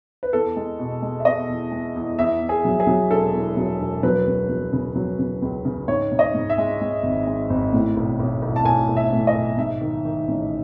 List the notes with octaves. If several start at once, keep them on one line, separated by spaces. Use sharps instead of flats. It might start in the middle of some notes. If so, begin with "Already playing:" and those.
B4
E2 A4
G#3
B2
G#3
E5
B2 D#5
E2
G#3
E2
E2 E5
E2
G#4
F#3
G#4
F#3
E1 A4
E2
F#3
E1
F#3 B4
C#2
F#3
C#3
F#3
C#3
C#2
C#3
G#2 C#5
G#2
D#5
G#2
E5
G#3
G#3
G#1
G#3
G#1
A2
B1
B1
B1
A5
B1 G#5
B1
E5
A2
D#5
B1
G#2 E5
D#3
D#3
A1